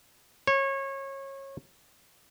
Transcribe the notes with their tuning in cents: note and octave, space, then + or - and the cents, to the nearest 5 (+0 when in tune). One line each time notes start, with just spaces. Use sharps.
C#5 -25